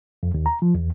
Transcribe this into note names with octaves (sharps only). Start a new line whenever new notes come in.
F2
D#2
A#5
F3
E2